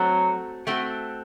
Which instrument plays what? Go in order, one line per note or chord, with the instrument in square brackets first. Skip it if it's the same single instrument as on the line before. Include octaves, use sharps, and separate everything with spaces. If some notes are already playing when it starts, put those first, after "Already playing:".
Already playing: [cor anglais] F#3 [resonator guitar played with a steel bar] A3 C4 F#4 A4
[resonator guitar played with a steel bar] A3 C4 F#4 A4